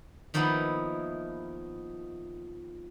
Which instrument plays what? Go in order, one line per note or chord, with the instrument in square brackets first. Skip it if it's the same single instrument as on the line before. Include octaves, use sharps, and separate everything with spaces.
[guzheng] D#3 F3 A#3 B3 D#4 E4